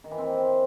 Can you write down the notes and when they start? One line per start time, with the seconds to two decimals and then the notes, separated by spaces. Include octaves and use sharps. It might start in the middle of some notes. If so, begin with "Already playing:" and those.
0.04 D#3
0.11 E3
0.18 C4